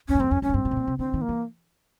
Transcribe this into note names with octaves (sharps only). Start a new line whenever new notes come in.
E2 C#4
F#2
F2 C4
F2 C#4
F#2 C#4
G#2
G2 C4
A2
B2
A#2
C3
D3 C4
D#3
A#3
E3